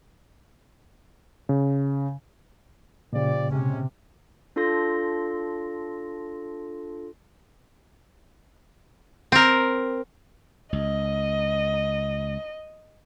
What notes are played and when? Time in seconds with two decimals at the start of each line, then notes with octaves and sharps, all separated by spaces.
1.49 C#3
3.13 A#2 C#3 F3 G4 D5
3.51 C3 G#3 C#4
4.56 D4 F4 A4 C6 A#6
9.32 C4 A#4
10.73 C#2 D#5